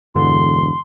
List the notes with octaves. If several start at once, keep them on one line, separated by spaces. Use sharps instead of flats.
E1 G2 D3 E3 C6